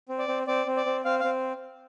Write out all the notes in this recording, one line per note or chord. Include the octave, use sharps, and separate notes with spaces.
C4
D5
C4
C4 D5
C4
D5
C4
C4 F5
C4 F5